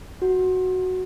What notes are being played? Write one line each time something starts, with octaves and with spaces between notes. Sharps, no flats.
F#4